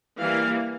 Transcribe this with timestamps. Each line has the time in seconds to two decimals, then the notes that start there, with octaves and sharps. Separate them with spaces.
0.19 E3 G3 A#3 F5